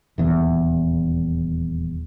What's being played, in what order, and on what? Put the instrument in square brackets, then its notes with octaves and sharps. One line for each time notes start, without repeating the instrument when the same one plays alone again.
[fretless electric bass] D#1 E2